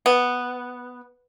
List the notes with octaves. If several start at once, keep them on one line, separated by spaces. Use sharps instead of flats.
B3